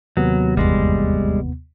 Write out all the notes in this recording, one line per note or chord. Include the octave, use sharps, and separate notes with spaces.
D#2 C3 F#3 B3
G1 E2 G3 G#3